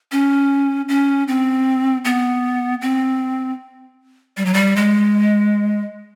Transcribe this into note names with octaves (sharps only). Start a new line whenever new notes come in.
C#4
C#4
C4
B3
C4
G3
F#3
G3
G#3